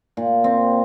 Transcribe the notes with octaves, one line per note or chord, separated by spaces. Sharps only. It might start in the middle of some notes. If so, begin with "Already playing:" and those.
A#2
C4